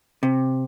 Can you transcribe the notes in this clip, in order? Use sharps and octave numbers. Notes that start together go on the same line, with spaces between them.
C3